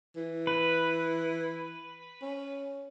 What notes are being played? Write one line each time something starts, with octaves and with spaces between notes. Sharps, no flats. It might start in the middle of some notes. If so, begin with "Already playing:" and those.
E3
B4
C#4